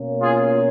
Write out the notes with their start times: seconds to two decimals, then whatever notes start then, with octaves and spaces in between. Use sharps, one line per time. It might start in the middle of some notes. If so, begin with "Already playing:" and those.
Already playing: B2 A#3 C#4
0.21 F4 G#4